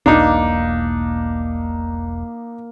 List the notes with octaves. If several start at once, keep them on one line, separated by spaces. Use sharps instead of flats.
E1 B1 A#3 D4 D#4